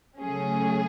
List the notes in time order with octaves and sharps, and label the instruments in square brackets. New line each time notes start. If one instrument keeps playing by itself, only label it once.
[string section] C#3 F#3 A3 C#4 G#4